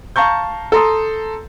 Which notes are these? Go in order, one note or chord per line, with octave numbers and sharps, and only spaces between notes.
F5 A5 A#5 C#6 G6
A4 A#5 C6 D#6